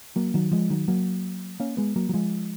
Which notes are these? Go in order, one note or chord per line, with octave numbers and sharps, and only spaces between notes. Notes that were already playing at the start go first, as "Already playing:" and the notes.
F#3 A#3
D#3 F#3
F3 G#3
D#3 F#3
F#3 A#3
A#3 C#4
G#3 B3
F#3 A#3
F#3
F3 G#3